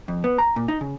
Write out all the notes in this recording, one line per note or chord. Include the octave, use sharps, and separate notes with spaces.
F2
B3
A#5
A#2
D#4
C#3